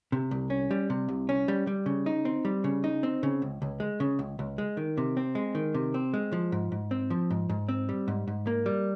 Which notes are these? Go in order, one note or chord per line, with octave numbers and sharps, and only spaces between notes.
C3
C2
C#4
G3
C3
C2
C#4
G3
G3
C#3
D#4
C4
G3
C#3
D#4
C4
C#3
C#2
C#2
G#3
C#3
C#2
C#2
G#3
D#3
C3
C4
G#3
D#3
C3
C4
G#3
F3
G#2
G#2
C4
F3
G#2
G#2
C4
G3
G#2
G#2
A#3
G3